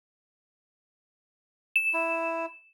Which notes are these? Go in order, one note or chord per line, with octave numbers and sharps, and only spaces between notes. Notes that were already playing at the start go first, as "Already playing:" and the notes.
E7
E4